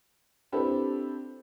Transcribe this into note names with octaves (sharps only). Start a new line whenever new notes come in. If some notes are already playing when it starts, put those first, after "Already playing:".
C4 D4 E4 G4 A4 B4